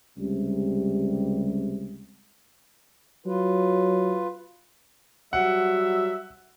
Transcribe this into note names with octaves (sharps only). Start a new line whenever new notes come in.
C#2 C3 G3
F#3 F4 B4
F#3 G3 F#4 E5 F#5